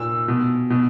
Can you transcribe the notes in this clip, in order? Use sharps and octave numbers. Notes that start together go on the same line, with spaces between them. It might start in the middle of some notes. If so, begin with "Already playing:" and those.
Already playing: A#2 E6
B2
B2